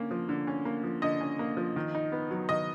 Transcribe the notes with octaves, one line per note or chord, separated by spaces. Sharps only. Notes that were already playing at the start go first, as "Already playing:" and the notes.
Already playing: D3 A#3 C#4
F3
D3
C#4
A#3
F3
D3 D#5
C#4
A#3
F3
D#3
D#4
B3
F#3
D#3 D#5